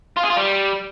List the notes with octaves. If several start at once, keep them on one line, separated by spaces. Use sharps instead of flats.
F4
G#4
F4
G3